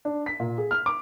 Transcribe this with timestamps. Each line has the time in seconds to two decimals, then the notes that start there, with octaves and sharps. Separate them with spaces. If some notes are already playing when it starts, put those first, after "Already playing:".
0.05 D4
0.26 B6
0.40 A#2
0.58 G#4
0.71 F6
0.86 D6